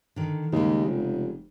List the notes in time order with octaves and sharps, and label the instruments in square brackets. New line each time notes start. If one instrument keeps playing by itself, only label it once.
[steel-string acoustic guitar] D3 D#3
[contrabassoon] D#2 [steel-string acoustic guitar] C#3 G3 G#3
[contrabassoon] F1